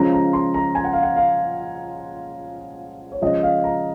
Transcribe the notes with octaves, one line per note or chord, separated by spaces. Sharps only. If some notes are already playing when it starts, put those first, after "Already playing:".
Already playing: C#3 F3 G#3 C#4 A#5
A#5
C6
A#5
G#5
F#5
F5
F#5
F5
C#5
C#3 F3 G#3 D#5
F5
A#5